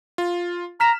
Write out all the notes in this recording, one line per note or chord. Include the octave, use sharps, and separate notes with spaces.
F4
A#5 F6 B6 E7